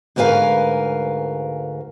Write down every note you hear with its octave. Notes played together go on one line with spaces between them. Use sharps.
D2 G#2 A#4 B4 F5 G#5